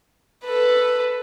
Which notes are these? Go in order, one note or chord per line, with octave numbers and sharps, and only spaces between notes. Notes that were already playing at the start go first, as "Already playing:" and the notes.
A4 B4